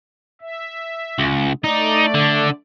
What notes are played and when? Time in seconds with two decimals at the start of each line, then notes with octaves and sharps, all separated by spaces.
0.41 E5
1.18 C#2
1.64 A3 D#4 D5
2.15 D3